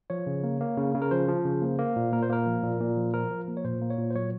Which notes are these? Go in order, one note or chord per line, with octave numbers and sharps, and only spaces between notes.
F3 C#5
C#3
A#3
A#3
C#3
C#3
A#4
F3 C5
F3
C#3
A#3
A#3
A#2
A#2 A#4
C5
A#3 A#4
F3
A#2
A#2
F3
F3 A#4
F3
A#3
C#5
A#2 C5
A#3
C#5
A#2
C5
F#3 C#5